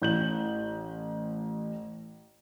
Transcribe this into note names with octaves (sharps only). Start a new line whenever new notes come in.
A1 G6 F#7